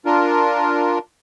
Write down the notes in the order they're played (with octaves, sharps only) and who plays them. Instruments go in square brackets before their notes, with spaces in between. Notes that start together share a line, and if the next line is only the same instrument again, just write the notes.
[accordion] D4 F4 A#4